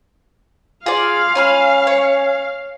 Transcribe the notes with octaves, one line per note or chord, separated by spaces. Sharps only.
F4 G#4 D5 F5
C#4 G#5 B5 F6
C#5